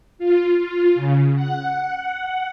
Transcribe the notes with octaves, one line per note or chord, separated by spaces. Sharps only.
F4
F4
C#3
F#5